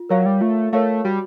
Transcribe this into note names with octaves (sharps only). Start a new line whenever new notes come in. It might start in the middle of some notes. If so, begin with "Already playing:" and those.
Already playing: F4
F#3 A#4 C#5 F5
G3
A3 F4
A3 A#4 C#5 F5
G3 F#4